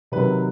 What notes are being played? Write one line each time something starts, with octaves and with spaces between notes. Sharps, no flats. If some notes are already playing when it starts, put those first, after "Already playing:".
C3 D#3 F#3 B4